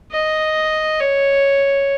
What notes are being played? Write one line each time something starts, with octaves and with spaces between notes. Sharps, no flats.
D#5
C#5